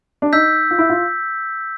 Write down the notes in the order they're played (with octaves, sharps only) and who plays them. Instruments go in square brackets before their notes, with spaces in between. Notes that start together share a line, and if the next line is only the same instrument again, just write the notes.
[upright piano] D4
[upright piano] D#4 [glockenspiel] E6 G6 B6
[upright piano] F4
E4
F4